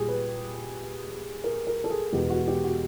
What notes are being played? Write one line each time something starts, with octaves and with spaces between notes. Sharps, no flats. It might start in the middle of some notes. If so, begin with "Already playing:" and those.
Already playing: A#2 G3 G4 G#4
B4
A#4
A#4
A4
G#4
E2 B2 G#3 G4
F#4
G4
F#4